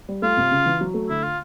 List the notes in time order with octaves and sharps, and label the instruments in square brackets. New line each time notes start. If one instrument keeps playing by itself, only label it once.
[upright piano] G3
[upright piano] A3 [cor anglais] F4
[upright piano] C3
C#3
E3
F#3
A3
[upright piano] D3 [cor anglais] E4
[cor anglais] F4